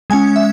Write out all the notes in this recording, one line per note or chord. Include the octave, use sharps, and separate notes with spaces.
G#3 C#4 G#5
E5